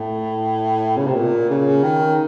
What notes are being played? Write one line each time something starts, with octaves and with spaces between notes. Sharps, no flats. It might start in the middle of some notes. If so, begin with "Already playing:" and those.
Already playing: A2
C#3
C3
A#2
C#3
D#3